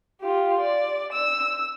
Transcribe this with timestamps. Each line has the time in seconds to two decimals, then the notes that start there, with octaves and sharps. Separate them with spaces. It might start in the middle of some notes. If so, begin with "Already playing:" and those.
0.21 F4 G4
0.61 D5
1.13 E6